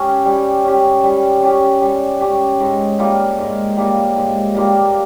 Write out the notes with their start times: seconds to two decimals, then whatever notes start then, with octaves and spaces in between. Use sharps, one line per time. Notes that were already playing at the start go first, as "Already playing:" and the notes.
Already playing: C#4 G4
0.25 G3
0.65 C#4 G4
1.04 G3
1.43 C#4 G4
1.81 G3
2.21 C#4 G4
2.60 G#2
2.99 G3 A#3 F4
3.38 G#2
3.77 G3 A#3 F4
4.16 G#2
4.55 G3 A#3 F4